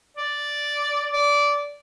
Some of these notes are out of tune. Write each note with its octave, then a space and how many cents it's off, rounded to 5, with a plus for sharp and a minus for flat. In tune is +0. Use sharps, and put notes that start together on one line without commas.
D5 -5
D5 -15